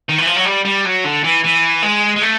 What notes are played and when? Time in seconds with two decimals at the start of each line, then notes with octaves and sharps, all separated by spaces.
0.09 D#3
0.18 E3
0.27 F3
0.37 F#3
0.45 G3
0.65 G3
0.85 F#3
1.04 D3
1.24 E3
1.44 E3
1.82 G#3
2.16 G#3
2.22 A3